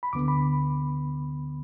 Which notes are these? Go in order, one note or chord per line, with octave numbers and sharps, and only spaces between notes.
B5
D2 D3 B3 D6
B5